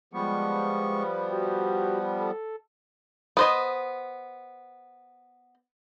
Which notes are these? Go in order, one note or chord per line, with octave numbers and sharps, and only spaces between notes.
F3 G3 G#3 B3 C#6
F#4 G4
A4
B3 C5 D#5